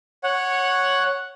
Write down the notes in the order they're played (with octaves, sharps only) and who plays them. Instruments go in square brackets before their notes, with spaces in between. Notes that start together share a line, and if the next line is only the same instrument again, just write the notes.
[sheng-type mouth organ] C#5 F#5